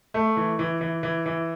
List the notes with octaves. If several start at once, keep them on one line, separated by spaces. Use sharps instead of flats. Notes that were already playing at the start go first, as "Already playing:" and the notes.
A3
E3
E3
E3
E3
E3